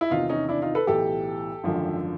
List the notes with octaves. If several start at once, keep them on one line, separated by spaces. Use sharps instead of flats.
E4
E2 C3 D#3 D#4 F4
C#4 D#4
D4 E4
D#4 F4
A4 B4
B1 A2 E3 G4 A4
G#1 F#2 D3 F3